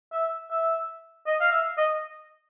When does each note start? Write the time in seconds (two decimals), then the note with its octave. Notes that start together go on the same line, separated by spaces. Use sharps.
0.12 E5
0.51 E5
1.27 D#5
1.41 F5
1.52 E5
1.78 D#5